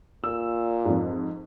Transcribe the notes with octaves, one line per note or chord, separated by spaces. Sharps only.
A#2 E6
F2 G#2